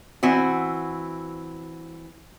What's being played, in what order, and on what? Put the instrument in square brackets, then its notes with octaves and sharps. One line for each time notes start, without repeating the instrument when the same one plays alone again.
[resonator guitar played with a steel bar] E3 C4 F#4